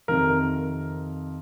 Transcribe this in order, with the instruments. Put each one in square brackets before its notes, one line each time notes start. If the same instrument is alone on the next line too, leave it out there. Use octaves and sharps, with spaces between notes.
[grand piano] F2 C3 D#3 A#4